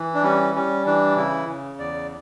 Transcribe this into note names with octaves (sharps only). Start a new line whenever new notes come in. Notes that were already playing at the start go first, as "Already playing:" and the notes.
Already playing: E3
D4
G3 C#4
G3 C#4
E3 D4
C#3 E4
C#3
E2 D5